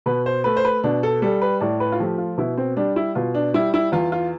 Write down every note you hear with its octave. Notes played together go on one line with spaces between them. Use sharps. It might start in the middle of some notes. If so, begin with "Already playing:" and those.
B2 B4
C5
A3 B4
C5
B4
B2 D4
A4
G3 A4
B4
A2 D5
B4
F4
F3 A3 G4
F4
B2 E4
C4
G3 D4
E4
B2 F4
D4
G3 E4
E4
E2 F4
F4